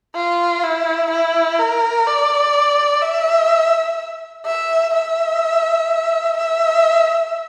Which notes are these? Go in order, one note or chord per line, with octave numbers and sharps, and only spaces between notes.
F4
E4
E4
A#4
D5
E5
E5
E5
E5